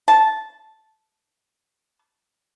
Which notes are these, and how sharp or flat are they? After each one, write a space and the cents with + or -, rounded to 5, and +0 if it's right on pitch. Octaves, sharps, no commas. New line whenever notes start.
A5 -10